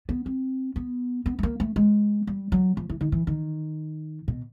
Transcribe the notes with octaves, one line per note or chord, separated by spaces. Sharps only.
B3
C4
B3
B3
A3
A#3
A3
G#3
G3
F#3
F3
E3
D#3
E3
D#3
B2